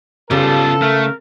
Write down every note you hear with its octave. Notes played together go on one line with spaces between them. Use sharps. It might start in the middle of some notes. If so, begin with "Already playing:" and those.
C#3 G3 B3 F4 A4
A3 A#4